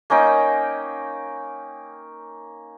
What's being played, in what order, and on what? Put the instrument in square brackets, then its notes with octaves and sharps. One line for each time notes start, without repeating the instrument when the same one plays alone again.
[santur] A#3 C#4 D#4 G5